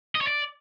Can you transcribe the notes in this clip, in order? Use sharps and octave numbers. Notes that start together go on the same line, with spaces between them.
D#5
C#5
D5